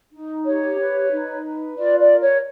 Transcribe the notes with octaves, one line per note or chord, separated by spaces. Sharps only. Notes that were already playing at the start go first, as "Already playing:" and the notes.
D#4
G4 C#5
B4
D#4
B4
F4 D5
D5
A#4
C#5